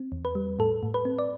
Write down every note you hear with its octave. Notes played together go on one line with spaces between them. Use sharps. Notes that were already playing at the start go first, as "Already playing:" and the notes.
Already playing: C4
E2
B4
G3
A2 A4
A2
B4
C4
D5